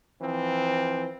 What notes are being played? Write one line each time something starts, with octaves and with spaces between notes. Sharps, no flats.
E3 F3 C4